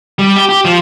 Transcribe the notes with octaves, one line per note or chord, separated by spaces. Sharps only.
G3
G4
G4
F3